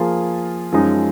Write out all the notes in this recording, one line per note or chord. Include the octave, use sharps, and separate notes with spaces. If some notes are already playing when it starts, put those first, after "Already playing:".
Already playing: F3 A#3 F4 G#4
F#2 F3 G#3 D#4